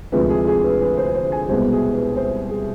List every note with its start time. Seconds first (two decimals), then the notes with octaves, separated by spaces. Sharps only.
0.12 D2 C3 F3 G#3 B4
0.29 G#4
0.47 G#4
0.64 B4
0.81 B4
0.98 C5
1.14 C5
1.32 G#5
1.49 C2 B2 G#3 B3 C5
1.72 G#4
1.94 B4
2.16 C5
2.51 G#4